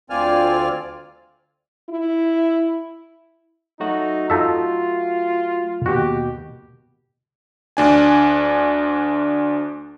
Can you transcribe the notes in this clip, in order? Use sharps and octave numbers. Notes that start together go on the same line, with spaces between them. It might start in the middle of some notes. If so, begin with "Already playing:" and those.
D2 C4 F4 D5 G#5 F6
E4
F#3 A3 D#4 F#4
D#4 F4 A4 E5
D#2 B2 F#4 G4
D2 D4 G#5